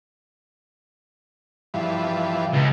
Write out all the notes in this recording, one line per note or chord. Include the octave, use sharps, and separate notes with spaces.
G2 E3 F3
C#2